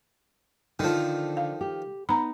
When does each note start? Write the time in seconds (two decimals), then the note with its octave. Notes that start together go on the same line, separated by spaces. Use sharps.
0.79 D3 D#3 F3
1.37 F5
1.61 G4
2.09 B3 D#4 A#5 B5